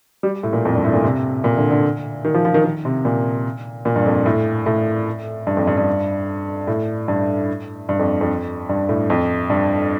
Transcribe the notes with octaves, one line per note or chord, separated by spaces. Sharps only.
G3
A2
A#2
F2
G2
A2
A#2
C3
A#2
D3
D3
D#3
F3
F3
D#3
D#3
C3
A#2
A#2
G2
F2
A2
A2
G2
F2
G2
G2
A2
G2
G2
F2
F2
G2
A2
F2
G2